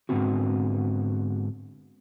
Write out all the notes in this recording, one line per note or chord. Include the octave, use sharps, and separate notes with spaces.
G#2 D3 D#3 B3 C4 F#4